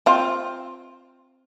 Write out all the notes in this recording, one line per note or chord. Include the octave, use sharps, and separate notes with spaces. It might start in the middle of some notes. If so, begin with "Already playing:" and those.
C4 F4